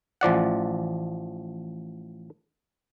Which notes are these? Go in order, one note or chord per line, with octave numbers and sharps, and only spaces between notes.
A1 F3 D5 F#5